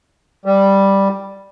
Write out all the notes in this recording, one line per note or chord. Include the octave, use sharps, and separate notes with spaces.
G3